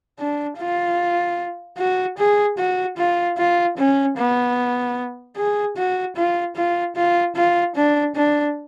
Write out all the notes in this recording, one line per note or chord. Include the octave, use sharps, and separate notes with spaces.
D4
F4
F#4
G#4
F#4
F4
F4
C#4
B3
G#4
F#4
F4
F4
F4
F4
D4
D4